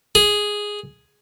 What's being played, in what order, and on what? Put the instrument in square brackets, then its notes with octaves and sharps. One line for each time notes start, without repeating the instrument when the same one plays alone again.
[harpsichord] G#4